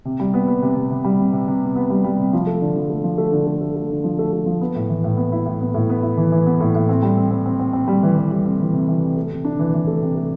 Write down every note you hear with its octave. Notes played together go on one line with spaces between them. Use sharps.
C3
G3
B3
B3
C3
C3
C3
G3
C3
C3
C3
B3
B3
G3
G3
C3
F3
A3
D3
F3
A3
F3
A3
D3
A3
A3
A3
D3
F3
A3
A3
F3
B3
A2
E3
A2
B3
E4
A2
B3
A2
B3
E4
E3
E3
B3
A2
A2
C4
G3
C4
C4
C4
C4
C4
G3
E3
E3
G3
C4
E3
C3
E3
C3
A3
C3
D4
E3
E3
A3
C3
A3